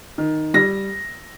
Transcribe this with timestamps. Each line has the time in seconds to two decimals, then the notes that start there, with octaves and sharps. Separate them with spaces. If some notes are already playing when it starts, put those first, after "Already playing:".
0.18 D#3
0.54 G3 A#6